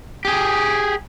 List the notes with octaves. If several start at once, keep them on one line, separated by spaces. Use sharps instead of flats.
G4 G#4